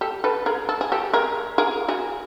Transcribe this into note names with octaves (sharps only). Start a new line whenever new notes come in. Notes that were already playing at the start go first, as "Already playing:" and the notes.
G4 A4
A4 B4
G#4 A#4
A4
G#4
G4 A4
G#4 A#4
G#4 A#4
F#4 G#4